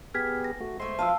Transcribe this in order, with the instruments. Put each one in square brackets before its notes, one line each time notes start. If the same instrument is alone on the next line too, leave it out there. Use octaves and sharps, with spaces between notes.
[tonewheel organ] B3 G4 G#4 [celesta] F6 G#6 B6
[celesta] A#6
[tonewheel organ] A3 F#4
[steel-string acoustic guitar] G#3 A3 [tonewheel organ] C5 E5 C6
[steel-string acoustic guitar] F3 F5 [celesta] A5 E6